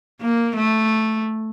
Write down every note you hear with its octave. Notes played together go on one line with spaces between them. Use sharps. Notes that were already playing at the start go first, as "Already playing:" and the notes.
A#3
A3